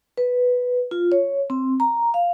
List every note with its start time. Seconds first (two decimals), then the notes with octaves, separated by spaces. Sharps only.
0.17 B4
0.91 F4
1.12 C#5
1.50 C4
1.80 A#5
2.14 F5